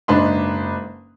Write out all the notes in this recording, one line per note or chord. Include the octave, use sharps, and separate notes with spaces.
F#1 G#2 D4 D#4 B4 C6